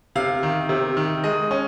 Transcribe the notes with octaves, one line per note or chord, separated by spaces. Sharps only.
C3 F5
D#3
C3
D#3
G#3 D#5
C#4